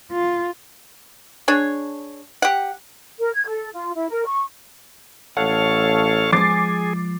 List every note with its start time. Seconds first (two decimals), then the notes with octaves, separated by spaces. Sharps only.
0.11 F4
1.48 D4 G#4 C#5
2.42 G4 F#5
3.19 A#4
3.35 G#6
3.47 A4
3.74 F4
3.94 E4
4.10 A#4
4.26 C#6
5.37 A1 A4 C#5 F5 F#5
6.33 F3 G#3 G#4 D6 A6 C7